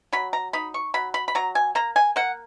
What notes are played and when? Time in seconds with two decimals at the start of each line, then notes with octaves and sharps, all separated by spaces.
0.13 F#3 B5
0.33 A#5
0.53 D#4 B5
0.74 C#6
0.94 F#3 B5
1.14 B5
1.28 B5
1.35 F#3 A#5
1.55 G#5
1.75 A#3 A#5
1.96 G#5
2.16 A#3 F#5